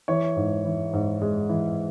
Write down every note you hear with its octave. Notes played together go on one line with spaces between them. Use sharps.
E3 C#5
G#2
E3
G#2
G#3
E3